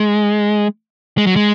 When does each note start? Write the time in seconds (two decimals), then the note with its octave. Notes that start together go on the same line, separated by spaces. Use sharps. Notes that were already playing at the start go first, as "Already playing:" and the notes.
Already playing: G#3
1.18 G#3
1.27 F#3
1.36 G#3